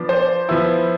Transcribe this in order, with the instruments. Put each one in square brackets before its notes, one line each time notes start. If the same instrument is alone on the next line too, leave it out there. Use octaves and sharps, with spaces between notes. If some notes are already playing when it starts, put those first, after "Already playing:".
Already playing: [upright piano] F3 B3 D4
C5
F3 B3 E4